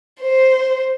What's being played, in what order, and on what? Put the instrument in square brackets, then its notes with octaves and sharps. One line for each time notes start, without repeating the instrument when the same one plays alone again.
[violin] C5